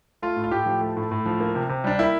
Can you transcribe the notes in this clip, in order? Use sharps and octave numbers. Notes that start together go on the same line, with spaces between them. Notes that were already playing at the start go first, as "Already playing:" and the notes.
A3 F4
A2
F4
A2 G4
F3
A3
A2
A2
F3
A#3
C3
C3
G3 D4
A#3 E4